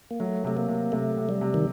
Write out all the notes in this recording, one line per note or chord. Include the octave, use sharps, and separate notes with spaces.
A#3
F#3 A3
C3 A3
A#3
C3
C3 A3
C3
G3
C3
D#3